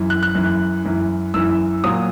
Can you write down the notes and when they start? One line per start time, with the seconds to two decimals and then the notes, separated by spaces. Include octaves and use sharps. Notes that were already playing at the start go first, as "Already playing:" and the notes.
Already playing: F#2 E3
0.10 F#6
0.23 F#6
0.35 F#2 E3
0.85 F#2 E3
1.34 F#2 E3 E6
1.84 A#2 F#3 D#6